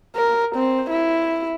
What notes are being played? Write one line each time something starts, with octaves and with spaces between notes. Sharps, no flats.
A#4
C4
E4